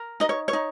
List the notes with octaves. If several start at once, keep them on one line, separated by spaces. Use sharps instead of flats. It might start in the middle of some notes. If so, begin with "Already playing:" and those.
Already playing: A#4
D#4 D#5
C#5
C#5
D#4